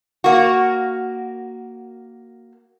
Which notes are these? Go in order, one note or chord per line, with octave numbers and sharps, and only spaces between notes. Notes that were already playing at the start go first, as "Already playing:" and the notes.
A#3 F#4